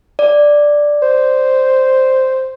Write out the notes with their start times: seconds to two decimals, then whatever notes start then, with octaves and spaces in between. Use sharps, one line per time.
0.19 D5
1.02 C5